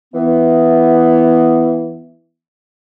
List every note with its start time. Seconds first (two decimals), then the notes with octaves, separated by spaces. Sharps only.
0.14 E3 B3